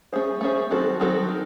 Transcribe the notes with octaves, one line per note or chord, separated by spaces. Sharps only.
A3 C#4 G#4 C5
A3 C#4 G#4 C5
D#3 F#3 C4 F#4 A4
D#3 F#3 C4 F#4 A4
D#3